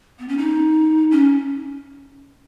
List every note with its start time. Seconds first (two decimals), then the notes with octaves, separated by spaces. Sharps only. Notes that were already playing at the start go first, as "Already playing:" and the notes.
0.19 B3
0.28 C#4
0.38 D#4
1.11 C#4